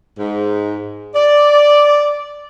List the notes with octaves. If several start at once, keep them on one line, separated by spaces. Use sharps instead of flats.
G#2
D5